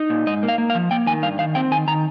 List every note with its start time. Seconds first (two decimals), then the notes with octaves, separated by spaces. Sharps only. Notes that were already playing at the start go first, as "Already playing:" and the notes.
Already playing: D#4
0.10 A#2
0.27 G#2 D#5
0.43 A#3
0.49 F5
0.58 A#3
0.70 F5
0.75 F3
0.91 A#3 G5
1.07 D#3 G#5
1.23 G2 F5
1.39 D#3 F5
1.55 C4 G5
1.71 D#3 G#5
1.88 D#3 A#5